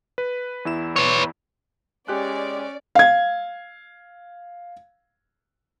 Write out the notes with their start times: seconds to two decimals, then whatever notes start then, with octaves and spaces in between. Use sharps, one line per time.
0.18 B4
0.65 E2 E4 E7
0.96 B4 C#5
2.08 G#3 C#4 G4 D5 F#6
2.95 F5 G#6